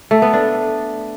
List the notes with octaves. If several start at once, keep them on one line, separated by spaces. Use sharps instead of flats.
A3
B3
D4